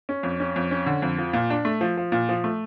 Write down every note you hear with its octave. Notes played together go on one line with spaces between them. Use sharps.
C#4
F2
C#4
F2
C#4
D3
F2
F3
A#2
D4
A3
F3
F3
A#2
F3
A3